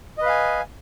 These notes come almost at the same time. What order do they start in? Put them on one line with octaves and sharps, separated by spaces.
D#5 B4 F5 G#5